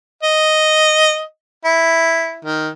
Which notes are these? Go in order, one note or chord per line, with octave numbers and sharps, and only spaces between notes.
D#5
E4
D#3